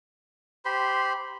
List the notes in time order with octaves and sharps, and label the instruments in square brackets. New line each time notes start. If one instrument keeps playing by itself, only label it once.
[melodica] G4 C5 B5 C6